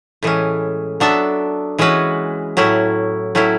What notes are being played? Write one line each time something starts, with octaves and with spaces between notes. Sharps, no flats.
A2 E3 G#3 C#4
F#3 B3 D4 A4 E5
E3 G#3 C#4 F#4 B4
A2 F#3 C#4 E4
A2 F#3 C#4 E4